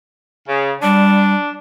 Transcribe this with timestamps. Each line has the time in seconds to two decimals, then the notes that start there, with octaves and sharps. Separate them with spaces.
0.49 C#3
0.83 G3 D4